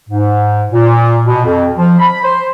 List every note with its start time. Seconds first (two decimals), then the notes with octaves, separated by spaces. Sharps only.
0.09 G#2
0.73 A#2
1.26 B2
1.45 F2
1.77 F3
1.99 B5
2.24 C5